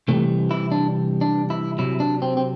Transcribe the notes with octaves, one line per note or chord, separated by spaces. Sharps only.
C3 E3 G3 A3
E4
D4
D4
E4
C3 F#3 E4
D4
C4
C4